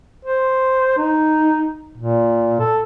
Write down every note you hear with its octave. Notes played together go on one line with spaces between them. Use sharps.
C5
D#4
A#2
A4